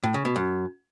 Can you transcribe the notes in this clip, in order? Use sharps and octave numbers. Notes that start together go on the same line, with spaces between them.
A2
C#3
B2
F#2